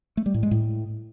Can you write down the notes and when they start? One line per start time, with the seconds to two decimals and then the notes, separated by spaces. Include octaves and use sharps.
0.17 A3
0.26 G3
0.34 A2
0.43 G#3
0.51 A2